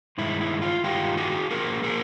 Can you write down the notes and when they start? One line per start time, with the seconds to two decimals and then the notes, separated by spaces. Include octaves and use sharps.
0.18 G2 D#3 G#3 E4
0.41 E4
0.62 F4
0.84 G2 D#3 G#3 F4 G4
1.17 F#4 G#4
1.51 D3 F3 A#3 G#4 A#4
1.84 G#4 A#4